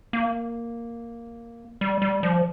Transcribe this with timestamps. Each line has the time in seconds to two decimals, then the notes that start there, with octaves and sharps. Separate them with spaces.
0.13 A#3
1.81 G3
2.02 G3
2.23 F3